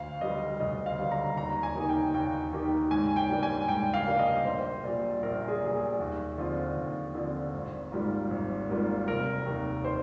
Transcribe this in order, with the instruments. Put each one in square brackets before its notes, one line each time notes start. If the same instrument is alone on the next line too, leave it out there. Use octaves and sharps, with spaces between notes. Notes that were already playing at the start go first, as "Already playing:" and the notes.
Already playing: [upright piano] D2 [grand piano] F5
[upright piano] D3 G3 [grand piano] D#5
[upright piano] D2 [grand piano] D#5
[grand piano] F5
[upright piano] D3 G3
[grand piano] A#5
[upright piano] D#2 [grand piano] A#5
[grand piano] G#5
[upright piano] D#3 A#3 D#4 G4
[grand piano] G5
[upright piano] D#2 [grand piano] G5
[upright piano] D#3 A#3 D#4 G4
[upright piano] G#2 [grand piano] G#5
[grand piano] G5
[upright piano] G3 A#3 D4
[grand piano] G#5
[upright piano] G#2 [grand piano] G5
[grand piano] F5
[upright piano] G3 A#3 D4
[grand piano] D#5
[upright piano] A#1 [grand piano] C5
[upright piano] A#2 G3
[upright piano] A#1 [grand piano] A#4
[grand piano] G#4
[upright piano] A#2 G3
[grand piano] G#4
[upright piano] D#2
D3 F3 C4 F4
D#2
D3 F3 C4 F4
G#1
G#2 G3 A#3 F4
G#1
G#2 G3 A#3 F4
[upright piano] F1 [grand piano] A#4
[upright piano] D#2 D#3
[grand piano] C5